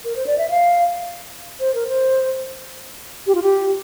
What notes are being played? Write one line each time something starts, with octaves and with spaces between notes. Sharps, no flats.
A#4
C5
D5
E5
F5
C5
A#4
C5
G4
F4
G4